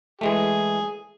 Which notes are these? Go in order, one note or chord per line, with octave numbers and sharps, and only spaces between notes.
E3 G#3 A3 G#4